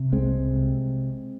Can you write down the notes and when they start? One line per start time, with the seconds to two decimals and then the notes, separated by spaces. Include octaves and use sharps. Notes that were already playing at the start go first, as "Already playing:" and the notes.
Already playing: C3
0.12 C2 G#3 C4
0.52 C3